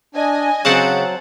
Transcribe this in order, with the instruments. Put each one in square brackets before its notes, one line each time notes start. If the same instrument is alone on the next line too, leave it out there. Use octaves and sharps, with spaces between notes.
[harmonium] D4 [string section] D#5 G#5
[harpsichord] C#3 [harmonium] F#3 [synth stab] C4 F#5 A5